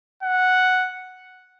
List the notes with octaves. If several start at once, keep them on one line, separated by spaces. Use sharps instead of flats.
F#5